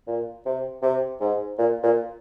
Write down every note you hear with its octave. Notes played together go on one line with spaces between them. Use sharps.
A#2
C3
C3
G#2
A#2
A#2